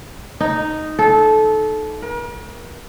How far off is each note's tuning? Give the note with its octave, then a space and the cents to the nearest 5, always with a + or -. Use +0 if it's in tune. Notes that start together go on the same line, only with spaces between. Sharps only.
D#4 -5
A4 -20
A#4 +45